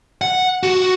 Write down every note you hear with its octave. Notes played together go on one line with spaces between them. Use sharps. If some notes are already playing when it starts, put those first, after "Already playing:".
F#5
F#4